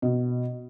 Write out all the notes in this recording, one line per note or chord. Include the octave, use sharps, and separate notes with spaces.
B2